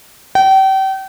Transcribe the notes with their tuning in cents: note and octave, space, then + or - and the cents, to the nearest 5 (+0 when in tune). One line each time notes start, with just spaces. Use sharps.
G5 -35